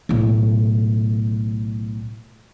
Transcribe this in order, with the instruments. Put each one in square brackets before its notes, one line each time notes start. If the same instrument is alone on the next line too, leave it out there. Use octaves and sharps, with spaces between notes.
[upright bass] B1 A2